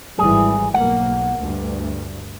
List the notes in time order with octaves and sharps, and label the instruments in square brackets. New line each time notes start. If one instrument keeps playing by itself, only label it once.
[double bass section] G#1 E3 G3 [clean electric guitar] G#4
[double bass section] B1 A#3 [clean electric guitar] F#5
[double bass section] D2 G2